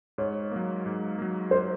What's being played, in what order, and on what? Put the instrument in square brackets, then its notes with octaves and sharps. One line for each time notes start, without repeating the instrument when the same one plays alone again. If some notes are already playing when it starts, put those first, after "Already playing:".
[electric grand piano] G#2 [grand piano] C#5
[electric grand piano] F#3 A#3
G#2
F#3 A#3
[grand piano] C5